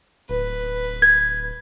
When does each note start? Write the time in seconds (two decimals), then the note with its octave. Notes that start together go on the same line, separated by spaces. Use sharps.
0.30 D1 B4
1.02 G#6